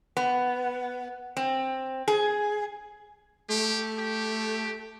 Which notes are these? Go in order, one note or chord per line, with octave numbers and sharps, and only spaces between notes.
B3
C4
G#4
A3 G4
G4